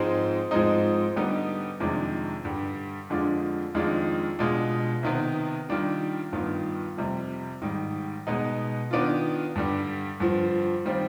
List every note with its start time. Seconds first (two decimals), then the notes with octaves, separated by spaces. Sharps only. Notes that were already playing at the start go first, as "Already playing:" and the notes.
Already playing: G#2 F3 G#3 C4 D#4
0.51 G#2 F3 G#3 C4 D#4
1.16 D3 G3 B3 D#4
1.80 F2 C3 D#3 G#3 D4
2.45 G2 D3 G3
3.10 F2 D3 G#3 D4 F4
3.75 F2 D#3 G#3 D4 F4
4.39 B2 G#3 D4 F4
5.03 C3 D#3 B3
5.69 D#3 G3 D4 F4
6.33 G2 D#3 B3 F4
6.97 F2 C3 G3
7.62 G#2 D#3 G3
8.27 B2 G#3 B3 D#4
8.91 D#3 B3 D4 F4
9.55 G2 D3 G3
10.20 G2 D3 F3
10.86 D#3 G3 C4 F4